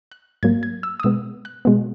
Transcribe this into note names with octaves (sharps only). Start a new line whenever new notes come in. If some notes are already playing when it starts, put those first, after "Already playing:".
F#6
G#2 F#3 A#3 G#6
G#6
E6
D#6
B2 G#3 B3 E6
F#6
B2 G#3 B3